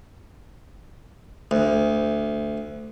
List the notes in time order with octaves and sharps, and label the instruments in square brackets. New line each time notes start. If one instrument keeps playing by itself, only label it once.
[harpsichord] D2